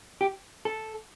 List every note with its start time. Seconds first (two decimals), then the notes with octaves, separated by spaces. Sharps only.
0.21 G4
0.65 A4